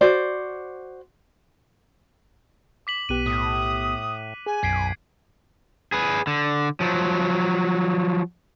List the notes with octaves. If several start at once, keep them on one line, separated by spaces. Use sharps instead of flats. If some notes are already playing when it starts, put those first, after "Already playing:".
F#4 C5 D5
D6 B6 F#7
B1 B3 G4 F#6 D#7
A2 D#6
G#4 G#5
B1 F#2 G#6 B6 C7 D7
G#4 B4
D3
F3 F#3